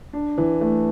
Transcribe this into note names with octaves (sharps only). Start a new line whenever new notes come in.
D4
E3
A3